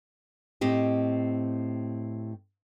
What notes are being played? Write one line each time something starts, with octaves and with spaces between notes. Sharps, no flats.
A2 C4 G4 D#5